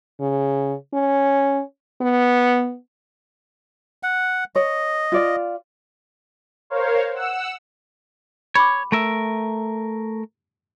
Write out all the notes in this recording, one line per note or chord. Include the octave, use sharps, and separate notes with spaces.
C#3
C#4
B3
F#5
C#5 D#5
F4 D5 F5
A#4 C5 C#5 F5
F#5 E6
C#5 B5 D6
A3 A#4 E5